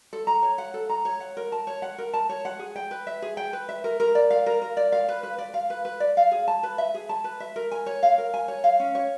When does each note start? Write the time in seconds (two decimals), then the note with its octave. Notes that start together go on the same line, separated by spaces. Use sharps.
0.13 A4
0.27 A#5
0.43 C#5
0.58 F#5
0.74 A4
0.90 A#5
1.05 C#5
1.20 F#5
1.37 A#4
1.52 A5
1.67 C#5
1.82 F#5
1.98 A#4
2.14 A5
2.29 C#5
2.45 F#5
2.59 G#4
2.76 G5
2.91 B4
3.07 E5
3.22 G#4
3.37 G5
3.53 B4
3.69 E5
3.84 A#4
4.00 A#4
4.15 D5
4.30 F5
4.46 A#4
4.62 A#4
4.77 D5
4.92 F5
5.09 B4
5.23 B4
5.38 D5
5.54 F5
5.70 B4
5.85 B4
6.00 D5
6.17 F5
6.31 G#4
6.48 A5
6.63 B4
6.78 E5
6.94 G#4
7.09 A5
7.24 B4
7.40 E5
7.56 A#4
7.71 G#5
7.86 C#5
8.03 F5
8.18 A#4
8.34 G#5
8.48 C#5
8.64 F5
8.80 C#4
8.95 C#5